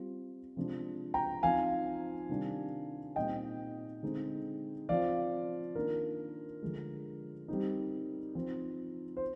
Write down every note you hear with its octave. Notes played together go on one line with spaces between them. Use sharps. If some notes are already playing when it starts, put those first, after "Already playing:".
Already playing: G3 C4 F4
C3 F3 G#3 D4
G5 A#5
F3 C4 D#4 F5 G#5
C3 D#3 G3 D4
A#2 G3 C4 D#4 D#5 G5
D3 G#3 C4 D#4
F3 C4 F4 D5 F5
D#3 A#3 D4 F4 A#4
D3 F3 G#3
G3 C4 D#4
F3 C4 D#4
C5